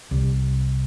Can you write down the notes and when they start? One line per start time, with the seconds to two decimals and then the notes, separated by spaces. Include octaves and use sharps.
0.11 C2